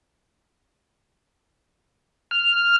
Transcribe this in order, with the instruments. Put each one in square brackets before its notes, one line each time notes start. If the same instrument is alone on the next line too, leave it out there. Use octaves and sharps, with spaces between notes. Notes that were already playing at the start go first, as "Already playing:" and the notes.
[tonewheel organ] F6